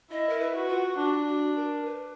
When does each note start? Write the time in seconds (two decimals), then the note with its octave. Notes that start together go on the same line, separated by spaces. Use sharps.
0.11 E4 D#5
0.29 A#4
0.40 B4
0.55 F#4
0.69 F4
0.98 D4 F#4
1.27 F#4
1.56 A#4
1.86 B4